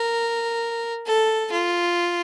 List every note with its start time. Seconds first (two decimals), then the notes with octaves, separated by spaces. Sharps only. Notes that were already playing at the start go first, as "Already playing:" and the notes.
Already playing: A#4
1.06 A4
1.52 F4